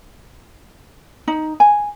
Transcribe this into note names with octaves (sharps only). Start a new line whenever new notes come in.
D#4
G#5